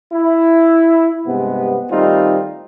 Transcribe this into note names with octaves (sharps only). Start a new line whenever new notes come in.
E4
G2 C3 G#3 B3
D#3 G3 A3 C4 D#4 F4